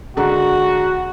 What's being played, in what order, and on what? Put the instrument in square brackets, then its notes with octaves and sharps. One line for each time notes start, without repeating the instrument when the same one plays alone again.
[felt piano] D3 G#3 A#5 [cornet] F#4